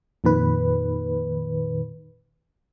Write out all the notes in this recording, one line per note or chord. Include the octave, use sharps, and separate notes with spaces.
F2 A#2 D#3 B4